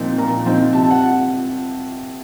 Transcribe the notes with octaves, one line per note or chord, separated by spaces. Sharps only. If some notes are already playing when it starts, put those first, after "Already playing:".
Already playing: A#2 F3 C4 D#4
A#2 A#5
F3 C4 D#4
C3 A5
A5
F#5